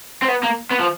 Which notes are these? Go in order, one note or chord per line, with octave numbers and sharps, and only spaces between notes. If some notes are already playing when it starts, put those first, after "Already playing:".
C4
B3
A#3
B3
F3